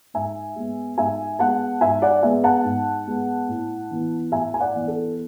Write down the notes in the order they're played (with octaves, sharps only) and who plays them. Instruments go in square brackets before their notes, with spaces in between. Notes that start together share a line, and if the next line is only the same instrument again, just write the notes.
[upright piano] G#2 E5 G#5
G#3 B3
G#2 E5 G#5
G#3 B3 F#5 A5
G#2 E5 G#5
D5 F#5
G#3 B3 E5 G#5
F#5 A5
G#2
G#3 B3
A2
E3 B3
A2 E5 G#5
G#5
D5 F#5
E3 B3
A4